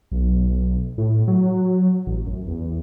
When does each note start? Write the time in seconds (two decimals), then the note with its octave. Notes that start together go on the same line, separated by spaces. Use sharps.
0.11 B1
0.98 A2
1.28 F#3
2.07 A1
2.26 F#2
2.47 E2